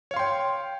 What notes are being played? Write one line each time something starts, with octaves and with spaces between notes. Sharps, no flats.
C#5 F5 G5 C6